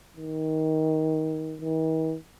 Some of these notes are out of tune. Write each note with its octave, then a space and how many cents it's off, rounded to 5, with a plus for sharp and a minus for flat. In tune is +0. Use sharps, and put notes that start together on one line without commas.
D#3 +20
D#3 +45